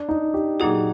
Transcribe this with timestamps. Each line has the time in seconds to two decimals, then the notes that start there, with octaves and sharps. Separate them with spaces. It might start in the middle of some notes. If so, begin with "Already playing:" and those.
Already playing: D4
0.09 D#4
0.34 G4
0.60 A#2 F#3 A#3 D#4 F#4 G#4